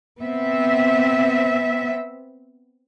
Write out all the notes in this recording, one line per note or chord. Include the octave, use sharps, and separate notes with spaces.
B3 C4 E5